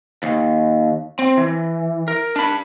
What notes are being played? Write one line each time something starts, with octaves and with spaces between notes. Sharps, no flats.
D#2
C4
E3
A#4
D4 B5